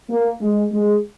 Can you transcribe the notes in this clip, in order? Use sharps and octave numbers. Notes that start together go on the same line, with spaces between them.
A#3
G#3
G#3